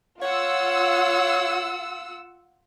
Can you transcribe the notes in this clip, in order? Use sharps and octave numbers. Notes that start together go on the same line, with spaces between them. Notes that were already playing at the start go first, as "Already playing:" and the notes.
F4 C#5 F#5 E6